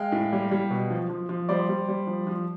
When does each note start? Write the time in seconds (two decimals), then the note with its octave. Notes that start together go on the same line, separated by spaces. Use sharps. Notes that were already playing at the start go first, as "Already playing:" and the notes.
Already playing: G#3 F5 G5
0.12 A2
0.33 G3
0.51 G3
0.71 B2
0.90 F3
1.10 F3
1.29 F3
1.49 G3 C5 D5
1.69 G3
1.88 G3
2.07 F3
2.27 F3